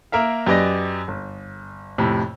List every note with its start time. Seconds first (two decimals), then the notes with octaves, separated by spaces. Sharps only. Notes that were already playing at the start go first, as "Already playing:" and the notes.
0.12 A#3 A#4 E5 F5
0.47 F#2 G4 B4 D5 D#5 A#6
1.08 G1
1.98 F2 A2 C3